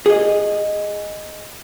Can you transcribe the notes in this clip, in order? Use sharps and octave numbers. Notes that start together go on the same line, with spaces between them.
G#4 D#5